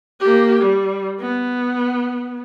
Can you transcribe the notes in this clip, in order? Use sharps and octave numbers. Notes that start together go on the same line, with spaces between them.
A#3 G4
G3
B3